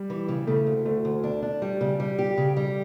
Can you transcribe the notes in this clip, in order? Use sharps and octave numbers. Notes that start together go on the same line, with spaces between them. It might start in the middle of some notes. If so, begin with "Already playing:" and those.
Already playing: G3
E3
C#3
C#3 A3
D2
D2 A3
D2
D4
D4
G3
C#3
G3
G4
C#3
G3